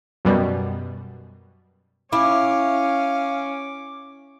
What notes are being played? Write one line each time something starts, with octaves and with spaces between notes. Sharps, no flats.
F#2 B2 G3
C#4 E4 F5 D6